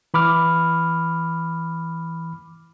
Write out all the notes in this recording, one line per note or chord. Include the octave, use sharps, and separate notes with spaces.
E3 B5 D6 F6